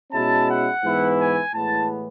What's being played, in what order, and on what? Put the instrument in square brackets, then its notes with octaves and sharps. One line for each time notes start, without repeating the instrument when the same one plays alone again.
[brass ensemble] B2 G#3 C#4 E4 A5
F#5
G#2 E3 B3 E4
G#5
A2 E3 G#3 B3 A5